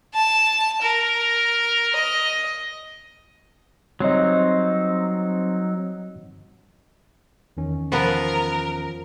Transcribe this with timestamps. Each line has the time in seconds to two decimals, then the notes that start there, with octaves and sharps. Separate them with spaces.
0.14 A5
0.82 A#4
1.96 D#5
4.00 F#3 G3 C4 D#4 C#5 D#5
7.57 E2 D#3 C#4
7.92 F3 B3 A#4 B4